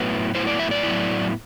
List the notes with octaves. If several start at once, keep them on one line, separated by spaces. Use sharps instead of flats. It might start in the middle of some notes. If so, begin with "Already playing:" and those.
Already playing: A2 F#3 B3 E4 B4
A2 F#3 B3 E4 C5
D5
E5
D5
A2 F#3 B3 E4